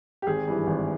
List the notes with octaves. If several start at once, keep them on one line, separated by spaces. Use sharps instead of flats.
G4
G#1 G#4
G2 E3
G#1